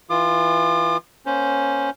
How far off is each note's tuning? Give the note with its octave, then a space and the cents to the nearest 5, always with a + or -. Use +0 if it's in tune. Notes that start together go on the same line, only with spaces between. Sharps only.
E3 -10 F4 +0 D6 +45
A#3 +30 C#4 +0 C5 +0